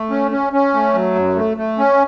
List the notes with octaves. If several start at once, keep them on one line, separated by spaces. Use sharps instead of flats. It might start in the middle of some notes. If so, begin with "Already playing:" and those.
Already playing: A3
C#4
C#4
C#4
A3
F#3
F#2
A3
A3
C#4